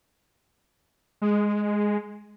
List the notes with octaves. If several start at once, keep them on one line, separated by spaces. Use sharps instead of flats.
G#3